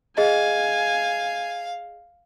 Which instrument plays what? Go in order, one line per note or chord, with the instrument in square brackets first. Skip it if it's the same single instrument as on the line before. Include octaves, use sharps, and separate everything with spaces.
[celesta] G#4 D#5 [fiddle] F5 [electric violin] G#5